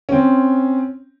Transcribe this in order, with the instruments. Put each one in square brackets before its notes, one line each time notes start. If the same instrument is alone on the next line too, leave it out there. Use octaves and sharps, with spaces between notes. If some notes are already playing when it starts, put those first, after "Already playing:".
[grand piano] C4 C#4